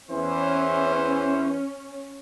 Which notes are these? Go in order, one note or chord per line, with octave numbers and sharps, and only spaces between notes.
E2 E3 C#4 C5